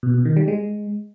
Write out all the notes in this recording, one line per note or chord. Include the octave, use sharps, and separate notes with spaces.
B2
B2
D#3
G3
G#3